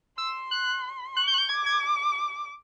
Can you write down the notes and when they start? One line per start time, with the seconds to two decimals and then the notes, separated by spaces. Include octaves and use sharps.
0.18 C6 E6
0.51 F#6
1.16 C#6 F#6
1.28 G6
1.34 F#6
1.38 G6
1.49 D6 G#6
1.66 G#6